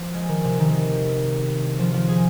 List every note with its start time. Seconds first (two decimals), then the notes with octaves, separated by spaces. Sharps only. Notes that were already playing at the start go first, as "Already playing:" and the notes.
Already playing: F3
0.14 G#3
0.29 D#3
0.44 C3
0.59 D#3
1.79 F3
1.94 F3
2.08 G#4